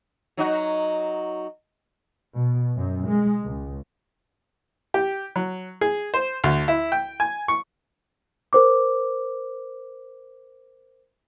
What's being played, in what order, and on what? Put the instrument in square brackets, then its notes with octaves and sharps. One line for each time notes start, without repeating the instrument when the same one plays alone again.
[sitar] F#3 D#4 F#4
[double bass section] B2
F#2
G#3
C#2
[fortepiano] G4
F#3
G#4
C5
D2
E4
G5
G#5
C#6
[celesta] A#4 C5 D6